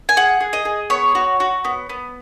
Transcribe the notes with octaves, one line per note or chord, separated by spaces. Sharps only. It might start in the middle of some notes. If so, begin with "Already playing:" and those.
G#5
G#4 F#5
G#4
D#5
G#4
B3 C#5
F#4
F#4
B3
B3